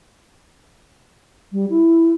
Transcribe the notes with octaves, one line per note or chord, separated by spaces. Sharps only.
G3
E4